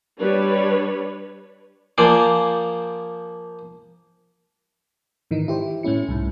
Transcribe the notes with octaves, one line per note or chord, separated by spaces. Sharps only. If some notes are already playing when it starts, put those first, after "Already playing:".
G3 D4 B4 C#5
F3 A#3 C5 D5 G#5
G#2 D#3 E3 D#4
E4 G4 C5
A2 A3 C#4 E4 C#7
C2 G#2